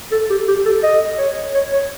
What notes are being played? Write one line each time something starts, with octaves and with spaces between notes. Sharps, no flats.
A4
G4
G4
A4
D#5
C#5
C#5
C#5